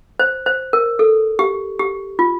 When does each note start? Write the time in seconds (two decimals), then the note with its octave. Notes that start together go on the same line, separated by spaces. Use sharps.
0.19 C5
0.46 C5
0.73 A#4
0.99 A4
1.39 G4
1.79 G4
2.19 F4